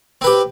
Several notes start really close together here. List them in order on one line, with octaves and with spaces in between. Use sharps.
C4 B4 G4